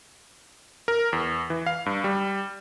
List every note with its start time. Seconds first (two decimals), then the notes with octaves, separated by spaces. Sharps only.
0.88 A#4
1.13 E2
1.50 E3
1.66 F5
1.86 G2
2.04 G3